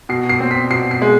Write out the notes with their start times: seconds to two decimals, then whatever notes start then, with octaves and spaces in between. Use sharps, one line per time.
0.09 B2 C7
0.29 C7
0.40 C4
0.51 B6
0.70 B2 C7
0.91 C7
1.02 G#3